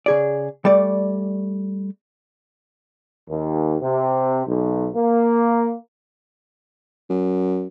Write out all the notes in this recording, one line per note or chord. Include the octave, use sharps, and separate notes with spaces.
C#3 G#4 D5
G3 A3 D5
D#2
C3
B1
A#3
F#2